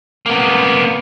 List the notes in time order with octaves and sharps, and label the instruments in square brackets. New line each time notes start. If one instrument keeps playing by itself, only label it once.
[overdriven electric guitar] A#3 B3